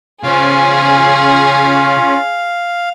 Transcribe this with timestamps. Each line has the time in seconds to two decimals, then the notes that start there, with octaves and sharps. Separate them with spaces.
0.24 C#3 C#4 F4 G#4 C5 F5